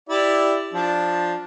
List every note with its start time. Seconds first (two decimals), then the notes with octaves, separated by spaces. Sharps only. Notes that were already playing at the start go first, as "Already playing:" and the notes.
0.09 E4 G4 D5
0.74 F3 D4